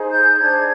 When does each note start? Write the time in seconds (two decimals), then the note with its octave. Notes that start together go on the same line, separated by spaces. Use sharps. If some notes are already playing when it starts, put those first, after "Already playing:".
Already playing: D#4 G#4 C5
0.10 G6
0.39 D4 G#4 C5 G#6